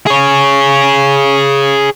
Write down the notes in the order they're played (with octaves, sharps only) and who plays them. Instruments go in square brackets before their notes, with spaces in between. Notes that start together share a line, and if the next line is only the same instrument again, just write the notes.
[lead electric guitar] G#4 C#5